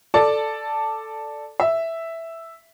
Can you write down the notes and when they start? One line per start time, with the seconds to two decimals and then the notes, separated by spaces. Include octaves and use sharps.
0.14 A4 D5 A5
1.60 E5